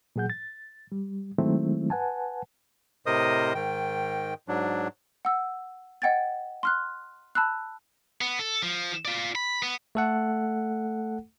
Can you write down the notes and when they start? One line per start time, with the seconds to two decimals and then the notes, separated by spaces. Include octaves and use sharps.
0.16 A#2 F#3 G#4 F#5 G6
0.30 A6
0.92 G3
1.38 D#3 F#3 G#3 A3 C4 E4
1.90 B4 F#5 G#5 A5
3.06 A2 C3 A#4 C5 D#5 D#6
3.55 G#2 D#3 G5
4.48 G#2 F#3 D4
5.25 F#5 E6
6.02 D#5 F#5 G5 G#6 A6
6.63 C6 F6 F#6
7.35 A5 B5 E6 F#6
8.21 B3
8.39 A4
8.63 F3
9.05 F4 D5
9.35 B5
9.63 B3
9.95 A3 A4 F#5